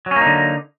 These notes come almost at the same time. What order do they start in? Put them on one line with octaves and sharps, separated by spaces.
F#3 C#4 A#3 D#4 D3